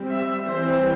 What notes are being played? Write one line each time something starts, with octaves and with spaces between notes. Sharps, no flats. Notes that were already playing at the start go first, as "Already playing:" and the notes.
Already playing: G3 C4
E5
E3 G3 C4 C5